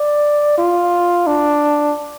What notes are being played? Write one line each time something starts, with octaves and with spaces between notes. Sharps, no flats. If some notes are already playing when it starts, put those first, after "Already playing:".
Already playing: D5
F4
D4